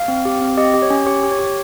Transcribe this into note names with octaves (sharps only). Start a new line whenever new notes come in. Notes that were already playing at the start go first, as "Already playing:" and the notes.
Already playing: F5
C4
G4
C4
G4 D#5
G4
C#5
C#4
G4 C#5
G4
C#5
G4